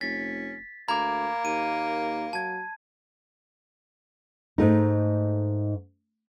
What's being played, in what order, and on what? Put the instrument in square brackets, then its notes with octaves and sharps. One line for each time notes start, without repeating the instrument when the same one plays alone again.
[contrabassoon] F1 [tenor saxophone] C#4 [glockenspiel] A6 [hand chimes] B6
[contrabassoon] D2 [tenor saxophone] A#3 [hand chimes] A#5 D6 [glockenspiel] B5 G#6
[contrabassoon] D#2 [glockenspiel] D#7
[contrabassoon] F#3 [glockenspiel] A5 G#6
[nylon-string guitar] G#2 A3 D#4